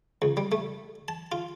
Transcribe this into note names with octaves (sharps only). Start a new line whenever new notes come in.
C#2
G3
A3
A5
F4